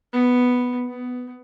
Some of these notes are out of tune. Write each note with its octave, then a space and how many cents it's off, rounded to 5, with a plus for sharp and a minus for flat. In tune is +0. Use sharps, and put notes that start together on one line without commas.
B3 +0
B3 +15